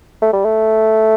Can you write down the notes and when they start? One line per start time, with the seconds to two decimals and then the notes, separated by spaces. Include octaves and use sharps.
0.22 A3
0.33 G3
0.44 A3